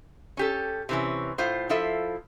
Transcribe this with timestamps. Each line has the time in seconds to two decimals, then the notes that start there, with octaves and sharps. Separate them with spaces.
0.37 C#4 G4 A4
0.89 C3 E3 C#4
1.38 A2 F4 C5
1.69 F3 E4 F4 A4 E5